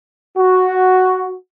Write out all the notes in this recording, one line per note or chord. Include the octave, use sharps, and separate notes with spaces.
F#4